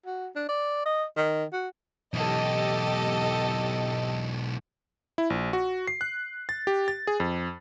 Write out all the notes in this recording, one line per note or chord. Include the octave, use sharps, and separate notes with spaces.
F#4
D4
D5
D#5
D#3
F#4
B1 E3 G4 A4 D#5
E4
A#1
F#4
C7
F#6
A6
G4
A6
G#4
F2